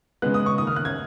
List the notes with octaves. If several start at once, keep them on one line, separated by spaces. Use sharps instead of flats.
C#3 G#3 B3 F#6
D#6
C#6
D#3 A#3 D#6
F6
F#6
G#6